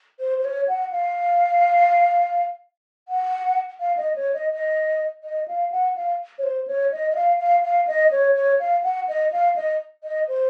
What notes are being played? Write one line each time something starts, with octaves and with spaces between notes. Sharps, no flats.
C5
C5
C#5
F#5
F5
F#5
F5
D#5
C#5
D#5
D#5
D#5
F5
F#5
F5
C#5
C5
C#5
D#5
D#5
F5
F5
F5
D#5
C#5
C#5
F5
F#5
D#5
F5
D#5
D#5
C5